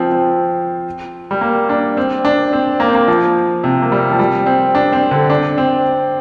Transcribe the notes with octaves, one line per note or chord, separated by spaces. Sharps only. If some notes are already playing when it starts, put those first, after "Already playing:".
Already playing: F3 C4
C4
G3
A#3
D4
C4
D4
C4
A#3
C4
A#3
F3
C3
A#3
G3
F3
G3
C4
D4
C4
D3
D4
C4